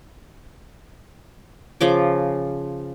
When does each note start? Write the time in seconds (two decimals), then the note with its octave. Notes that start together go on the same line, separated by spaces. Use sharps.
1.81 C#3 F3 D6